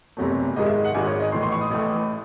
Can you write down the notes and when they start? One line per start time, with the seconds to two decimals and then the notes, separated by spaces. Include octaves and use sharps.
0.17 F#1 E2 C3 F#3 A3
0.56 G#1 G#2 D#3 G#3 D#5
0.66 E5
0.85 F#5
0.94 G#1 G#2 D#3 G#3 G#5
1.07 C#5
1.20 D#5
1.32 A1 A2 E3 A3 C6
1.43 C6
1.51 C#6
1.61 D#6
1.71 A1 A2 E3 A3